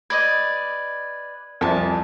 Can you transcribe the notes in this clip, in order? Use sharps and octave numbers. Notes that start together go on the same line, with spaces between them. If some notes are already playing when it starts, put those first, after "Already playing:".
B4 D5 D#5 G#6
C2 F2 G#5 A5